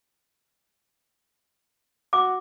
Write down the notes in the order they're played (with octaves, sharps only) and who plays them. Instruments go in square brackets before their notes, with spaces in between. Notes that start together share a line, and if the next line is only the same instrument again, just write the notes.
[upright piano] F#4 [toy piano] D6